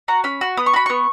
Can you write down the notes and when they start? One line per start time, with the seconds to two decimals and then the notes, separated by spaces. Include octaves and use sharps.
0.08 F#4 A#5
0.24 C#4 B5
0.41 F#4
0.57 B3 D#6
0.66 C#6
0.74 F#4 B5
0.86 B3 C#6